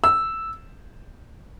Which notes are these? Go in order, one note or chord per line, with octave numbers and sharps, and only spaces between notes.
E6